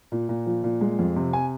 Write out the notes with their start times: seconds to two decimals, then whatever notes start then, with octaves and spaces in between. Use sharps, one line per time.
0.12 A#2
0.29 A#2
0.46 F3
0.64 A#2
0.81 G#3
0.99 F2
1.16 C3
1.33 G#5